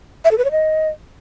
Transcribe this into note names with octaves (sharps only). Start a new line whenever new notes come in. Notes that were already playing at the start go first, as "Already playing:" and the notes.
E5
A4
B4
C#5
D#5